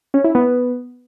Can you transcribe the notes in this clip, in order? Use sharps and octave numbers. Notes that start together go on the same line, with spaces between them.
C#4
E4
B3